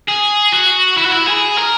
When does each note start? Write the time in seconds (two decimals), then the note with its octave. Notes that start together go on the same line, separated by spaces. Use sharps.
0.09 G#4
0.53 F#4
0.98 E4
1.06 F#4
1.13 E4
1.28 G#4
1.58 A#4